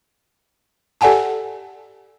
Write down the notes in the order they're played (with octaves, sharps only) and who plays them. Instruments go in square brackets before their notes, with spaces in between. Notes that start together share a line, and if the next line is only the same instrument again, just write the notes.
[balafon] G4 A4 D5 F#5 G#5 A5